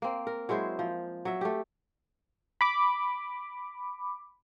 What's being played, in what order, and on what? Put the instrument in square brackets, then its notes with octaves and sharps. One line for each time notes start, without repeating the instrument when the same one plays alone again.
[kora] A#3 C4
A#4
F#3 G#3 E4 C5
F3
F#3 E5
A3 G4
[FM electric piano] B5 D6